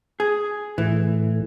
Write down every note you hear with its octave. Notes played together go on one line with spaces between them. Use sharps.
G#4
A2 E3